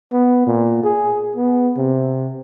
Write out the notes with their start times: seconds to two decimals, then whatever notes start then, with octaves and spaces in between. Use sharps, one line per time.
0.12 B3
0.46 A#2
0.84 G#4
1.36 B3
1.77 C3